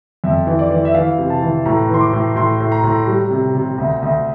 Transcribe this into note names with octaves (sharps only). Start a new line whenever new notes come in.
F2 E5
E3
D5
E3
E5
E3 F5
C3
A5
E3
A2 A#5
E3 C6
D6
A2
A2 C6
A2
A#5
A2
G3
C3
C3
D2
D2